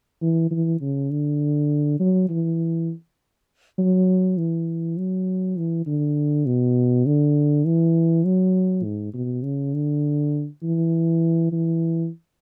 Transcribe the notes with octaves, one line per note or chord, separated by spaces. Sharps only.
E3
E3
C#3
D3
F#3
E3
F#3
E3
F#3
E3
D3
B2
D3
E3
F#3
G#2
B2
C#3
D3
E3
E3